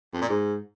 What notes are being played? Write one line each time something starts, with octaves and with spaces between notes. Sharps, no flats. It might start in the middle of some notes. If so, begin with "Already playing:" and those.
F2
A#2
G#2